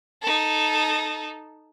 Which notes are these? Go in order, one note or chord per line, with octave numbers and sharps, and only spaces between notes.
D#4 A4